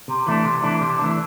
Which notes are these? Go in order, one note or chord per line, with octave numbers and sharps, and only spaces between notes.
C3
E3 A3 D4
C3
E3 A3 D4
C3
E3 A3 D4